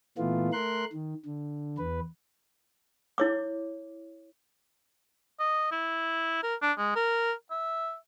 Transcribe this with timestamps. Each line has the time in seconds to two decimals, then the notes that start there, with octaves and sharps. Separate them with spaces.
0.18 A#2 E3 A3 B3 F4
0.53 A3 A#4 C6 F#6
0.93 D#3
1.26 D3
1.78 E2 B4
3.18 E4 C#5 D6
5.40 D#5
5.72 E4
6.43 A#4
6.62 D4
6.78 G#3
6.96 A#4
7.51 E5